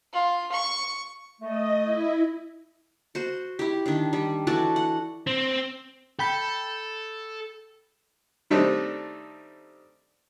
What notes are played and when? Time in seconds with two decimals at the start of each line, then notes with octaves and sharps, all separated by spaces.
0.13 F4
0.52 C#6
1.41 A3 D#5
1.77 E4
3.15 F#4 C5
3.59 E4 G4
3.86 D#3 D4
4.13 G3
4.47 E3 F#4 A4 D5
4.76 F#5
5.27 C4
6.19 A4 G5 B5 G6
8.50 D#3 G3 A3 C4 D4 D#4